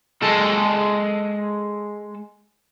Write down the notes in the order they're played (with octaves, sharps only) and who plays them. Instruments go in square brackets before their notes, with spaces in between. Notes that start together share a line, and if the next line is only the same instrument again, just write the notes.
[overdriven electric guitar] G#3 A4